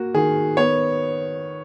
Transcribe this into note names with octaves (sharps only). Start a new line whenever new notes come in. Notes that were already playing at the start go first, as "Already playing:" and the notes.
Already playing: A#3 F#4
D#3 G#4
B3 C#5